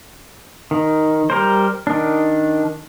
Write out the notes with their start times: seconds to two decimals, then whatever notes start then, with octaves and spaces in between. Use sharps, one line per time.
0.71 D#3
1.30 G3 A#4 C5
1.87 D#3 D4